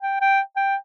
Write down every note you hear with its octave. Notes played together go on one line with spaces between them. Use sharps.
G5
G5
G5